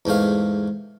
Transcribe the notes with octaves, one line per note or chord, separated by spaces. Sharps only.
E2 G#2 A3 F5